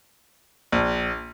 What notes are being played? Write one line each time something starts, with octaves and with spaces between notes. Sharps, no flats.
A#1